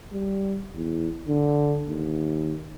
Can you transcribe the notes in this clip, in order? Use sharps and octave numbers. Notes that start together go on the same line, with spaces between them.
G3
E2
D3
D#2